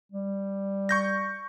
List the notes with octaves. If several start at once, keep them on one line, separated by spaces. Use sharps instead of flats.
G3
C#6 G6 A#6